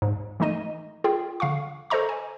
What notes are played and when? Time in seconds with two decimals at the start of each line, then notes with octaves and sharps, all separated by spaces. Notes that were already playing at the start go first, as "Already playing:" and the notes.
0.02 G#2
0.40 E3 A3 D#4 D#5 D#7
1.04 F4 G#4 G5
1.40 D3 F5 F#5 C#6
1.90 A4 C5 D#5 A#5 C#6
2.09 G#5